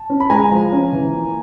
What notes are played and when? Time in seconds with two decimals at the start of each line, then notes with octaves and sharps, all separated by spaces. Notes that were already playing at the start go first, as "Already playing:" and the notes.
Already playing: A5
0.10 C#4
0.20 B5
0.30 G#3 G#5 A#5
0.51 F3
0.72 C#4
0.93 E3
1.14 A#3